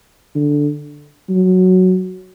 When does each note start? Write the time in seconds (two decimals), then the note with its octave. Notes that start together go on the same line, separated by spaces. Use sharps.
0.35 D3
1.30 F#3